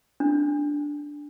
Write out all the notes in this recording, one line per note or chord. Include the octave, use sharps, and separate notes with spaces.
D4